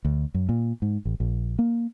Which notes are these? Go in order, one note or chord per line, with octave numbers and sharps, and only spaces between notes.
D2
F#2
A#2
G#2
A1
A#1
A#3